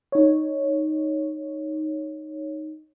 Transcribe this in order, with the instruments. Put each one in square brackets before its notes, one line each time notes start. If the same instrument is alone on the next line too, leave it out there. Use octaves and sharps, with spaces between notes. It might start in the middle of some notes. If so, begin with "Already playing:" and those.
[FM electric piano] D#4 C#5